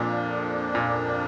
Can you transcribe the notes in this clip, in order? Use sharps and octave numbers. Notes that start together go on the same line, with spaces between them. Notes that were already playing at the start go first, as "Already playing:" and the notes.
Already playing: F2 A#2 F3 A#3 D4
A#2